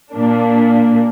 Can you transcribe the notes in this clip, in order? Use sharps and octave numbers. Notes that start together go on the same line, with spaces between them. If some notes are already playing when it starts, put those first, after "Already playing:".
A#2 A#3 D4